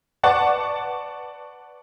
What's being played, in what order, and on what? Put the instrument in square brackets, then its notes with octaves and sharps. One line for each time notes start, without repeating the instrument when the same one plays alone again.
[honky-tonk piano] B4 D5 F#5 A5 C#6